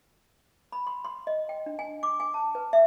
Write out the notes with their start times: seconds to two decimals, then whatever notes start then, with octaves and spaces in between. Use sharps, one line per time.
0.72 B5
0.87 C6
1.05 C6
1.27 D#5
1.49 G5
1.66 D4
1.79 G#5
2.03 D6
2.20 G#5
2.34 A5
2.55 B4
2.73 E5